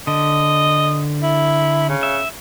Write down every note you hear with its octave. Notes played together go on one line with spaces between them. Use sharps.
D3 D#5
E4
C#3
E5